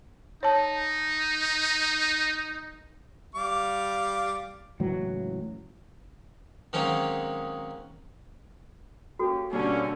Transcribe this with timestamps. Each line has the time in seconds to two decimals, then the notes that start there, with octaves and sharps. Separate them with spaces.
0.43 D#4 C#5 A5
3.35 G3 F5 D6
4.80 C#2 A2 E3 F#3
6.73 D#3 F#3 G#3 A#3 C4 C#4
9.19 A#3 C#4 F#4 G4 A4
9.53 B2 D3 G3 A#3 C#4